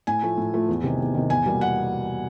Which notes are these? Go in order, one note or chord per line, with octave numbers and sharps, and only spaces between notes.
A2 G#5
F3 A3
A2
F3 A3
E2
C3 D#3
E2
C3 D#3
E2 G#5
B2 G3 A#3
F#5